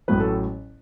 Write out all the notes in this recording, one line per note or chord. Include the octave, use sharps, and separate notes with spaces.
A1 A2 F#3 B4
A4